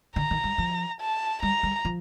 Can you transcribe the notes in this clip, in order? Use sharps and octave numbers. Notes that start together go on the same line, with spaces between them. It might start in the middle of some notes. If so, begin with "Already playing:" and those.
D3 A#5
D#3
G3
F3
A5
G3 A#5
G3
F3